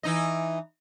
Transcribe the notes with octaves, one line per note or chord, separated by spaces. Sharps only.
E3 D#4 D#5